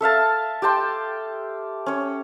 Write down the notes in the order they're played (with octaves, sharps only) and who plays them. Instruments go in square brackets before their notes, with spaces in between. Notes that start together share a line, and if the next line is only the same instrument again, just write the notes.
[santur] A4 E5 F5 A5
G4 G5 A5 C6
C#4 C#5